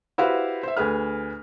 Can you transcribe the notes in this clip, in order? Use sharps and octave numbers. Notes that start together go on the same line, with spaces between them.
E4 F#4 G4 B4 C5 F5
C5 E5
D2 G#4 B4 F6